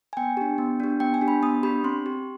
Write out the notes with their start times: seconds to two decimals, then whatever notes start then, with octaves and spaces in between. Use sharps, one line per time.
0.13 G#5
0.17 B3 G5
0.37 D4 G4
0.58 B3
0.80 D4 G4
1.00 B3 G5
1.14 G#5
1.21 D4 G4
1.28 B5
1.42 B3 D#6
1.63 D4 G4 B5
1.84 C4 C6
2.06 G4